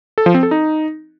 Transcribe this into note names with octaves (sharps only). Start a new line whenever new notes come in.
A4
F3
C4
A4
D#4